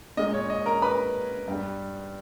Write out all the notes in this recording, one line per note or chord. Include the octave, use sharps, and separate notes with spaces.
A#2 G#3 D#5
C#5
D#5
A#4 A#5
B4 B5
G2 G3